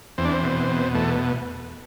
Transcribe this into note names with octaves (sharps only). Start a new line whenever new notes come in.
E2 C4
D4
C4
B2
B2
E2 A3